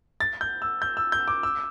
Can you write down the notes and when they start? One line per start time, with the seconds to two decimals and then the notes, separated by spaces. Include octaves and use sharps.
0.20 A6
0.41 G6
0.62 E6
0.82 G6
0.97 E6
1.12 G6
1.28 D6
1.43 E6